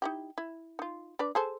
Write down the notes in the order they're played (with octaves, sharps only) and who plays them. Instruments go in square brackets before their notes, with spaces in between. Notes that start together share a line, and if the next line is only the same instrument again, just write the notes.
[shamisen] D#4 E4 G4
E4
D#4 F4
D4 B4 D5
G#4 A4 C5